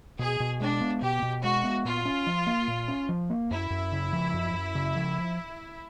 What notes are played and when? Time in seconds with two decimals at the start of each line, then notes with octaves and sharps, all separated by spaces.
0.19 B2 G#4
0.40 B2
0.60 G#3 D4
0.81 B3
1.02 B2 G4
1.22 B2
1.43 G#3 F#4
1.64 B3
1.85 A#2 F4
2.05 C#4
2.26 F3
2.47 A#3
2.68 A#2
2.88 C#4
3.09 F3
3.30 A#3
3.51 F#2 E4
3.70 F#2
3.92 C#3
4.12 F3
4.33 F#2
4.54 F#2
4.75 C#3
4.96 F3